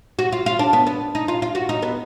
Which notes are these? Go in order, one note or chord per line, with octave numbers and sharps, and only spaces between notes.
F#4
F4
F4
D4
B3
B3
D#4
F4
F4
F#4
D#4
B3